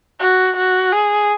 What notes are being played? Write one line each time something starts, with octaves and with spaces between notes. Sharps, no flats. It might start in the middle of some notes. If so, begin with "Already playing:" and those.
F#4
F#4
G#4